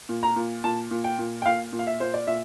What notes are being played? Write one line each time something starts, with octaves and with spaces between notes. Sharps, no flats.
A#2
A#5
A#2
A#2 A5
A#2
G5
A#2
G5
A#2 F5
A#2
F5
E5
A#2 C5
D5
A#2 E5